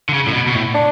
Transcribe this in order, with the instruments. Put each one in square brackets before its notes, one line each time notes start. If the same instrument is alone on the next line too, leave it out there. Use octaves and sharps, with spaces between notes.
[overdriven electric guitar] D3
C#3
A2
B2
B2
A2
[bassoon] D4